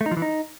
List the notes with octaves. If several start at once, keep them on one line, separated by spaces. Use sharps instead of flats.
A3
D#4
F3
E3
D#4